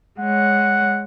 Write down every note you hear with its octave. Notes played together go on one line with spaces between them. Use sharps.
G#3 C#5 F#5